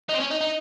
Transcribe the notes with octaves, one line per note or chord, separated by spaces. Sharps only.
D#4
C4
C#4
D#4
D#4